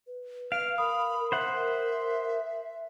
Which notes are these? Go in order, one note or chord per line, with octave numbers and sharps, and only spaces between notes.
B4
F5 F6 D7
A#4 B5 D#6
A#4 C5 E5 F#5